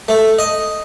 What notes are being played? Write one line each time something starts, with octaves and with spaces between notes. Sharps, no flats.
A3
D#5